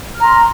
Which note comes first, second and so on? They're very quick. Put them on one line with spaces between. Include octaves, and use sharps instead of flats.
F6 A#5 C6